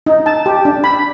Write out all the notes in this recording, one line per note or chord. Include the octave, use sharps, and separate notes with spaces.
D#4
A5
G4
D4
B5